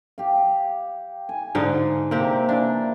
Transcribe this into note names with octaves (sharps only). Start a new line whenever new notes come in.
G4 F5
G#5
G#2 D3 D#4 C6
C3 A#3 C4 G4
E3 D4